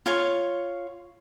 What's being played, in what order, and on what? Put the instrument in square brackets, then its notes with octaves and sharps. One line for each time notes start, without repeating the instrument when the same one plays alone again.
[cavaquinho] F4 C#5 C#6